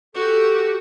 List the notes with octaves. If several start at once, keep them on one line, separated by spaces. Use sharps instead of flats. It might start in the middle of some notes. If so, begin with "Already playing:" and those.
F#4 G4 A4